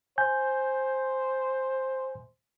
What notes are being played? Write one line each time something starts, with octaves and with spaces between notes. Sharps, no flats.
C5 G#5 G6